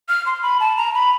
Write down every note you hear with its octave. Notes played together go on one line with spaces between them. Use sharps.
F6
C6
B5
A5
A#5
B5